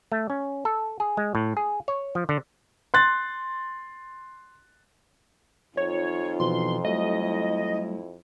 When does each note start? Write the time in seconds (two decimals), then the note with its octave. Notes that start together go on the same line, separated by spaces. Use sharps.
0.12 A3
0.30 C#4
0.65 A4
1.00 G#4
1.17 G#3
1.35 A2
1.57 G#4
1.88 C#5
2.15 F3
2.29 D3
2.94 C6 F#6 A6
5.77 F2 D#4 F4 C#5
6.40 B2 E3 F3 C6
6.85 F#3 G3 A3 E4 D#5